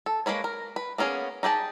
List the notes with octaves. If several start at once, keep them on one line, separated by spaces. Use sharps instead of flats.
A4
G#3 A#3 B4 C#5
A#4
B4
A#3 B3 C#4 G#4
D#4 G4 G#4 A5